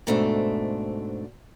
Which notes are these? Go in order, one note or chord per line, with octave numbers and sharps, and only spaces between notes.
G#2 B2 A3 C4 D4